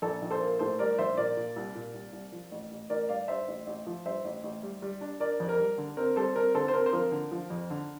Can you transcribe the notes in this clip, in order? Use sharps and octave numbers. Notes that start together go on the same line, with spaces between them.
A#1 A4
A#1
A4 C5
A#3
A2 A4 C5
G3 A#4 D5
A#1 C5 E5
A#2 A#4 D5
A#2
C2
A#2
C2
C2
F3
A1
A1
A1 A#4 D5
G2 D5 F5
G2 C5 E5
A1
A1
F3
G2 C5 E5
A1
A1
G3
G3
D4
D4 A#4 D5
F2
A#4
G3
D3
C4 A#4
G3 A4 C5
C4 A#4
D3 A4 C5
C5
C4 A#4
C5
F3 A#4
D3
F3
F2
D3